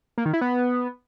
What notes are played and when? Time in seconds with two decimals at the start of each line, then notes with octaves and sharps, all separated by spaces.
0.18 A#3
0.26 D#3
0.33 E4
0.41 B3